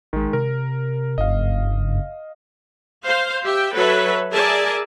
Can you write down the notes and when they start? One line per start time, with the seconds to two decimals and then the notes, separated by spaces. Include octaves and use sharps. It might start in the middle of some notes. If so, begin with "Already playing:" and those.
0.13 A1 D#3 G#3
0.33 C3 A#4
1.18 F#1 G2 D#5 F5
3.05 C5 F5
3.44 G4 E5 G5
3.73 F#3 A4 B4 C#5 E5
4.33 G#4 A#4 D5 E5 G#5 A5